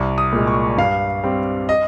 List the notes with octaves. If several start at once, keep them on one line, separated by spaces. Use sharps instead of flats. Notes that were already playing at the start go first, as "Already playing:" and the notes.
Already playing: C2
D#6
A#2 G#3
C#6
G2 F5
G3 C4
D#5